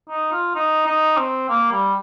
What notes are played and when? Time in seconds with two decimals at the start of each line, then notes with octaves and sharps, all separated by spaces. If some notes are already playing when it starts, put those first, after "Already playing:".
0.09 D#4
0.32 F4
0.55 D#4
0.86 D#4
1.17 C4
1.49 A#3
1.72 G3